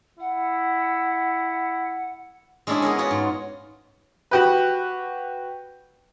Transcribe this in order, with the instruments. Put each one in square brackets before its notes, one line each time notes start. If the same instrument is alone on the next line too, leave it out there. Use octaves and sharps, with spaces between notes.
[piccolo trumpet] E4 [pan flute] F#5
[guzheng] G#3 C#4 D4 E4 G4 G#4
B3 G#4 A#4 C#5
F4 F#4 B4 C#5
G#2
[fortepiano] F#4 G4 B4